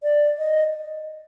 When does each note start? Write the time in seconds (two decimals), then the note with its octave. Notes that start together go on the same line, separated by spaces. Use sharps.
0.03 D5
0.38 D#5